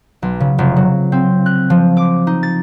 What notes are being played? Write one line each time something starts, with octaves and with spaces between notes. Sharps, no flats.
B1
C#3
F1
F#3
C4
F#6
F3
D6
D#4
A6